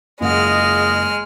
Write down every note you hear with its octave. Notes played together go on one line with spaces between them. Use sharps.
F#1 G#3 F4 G#4 D#5 F#5 F6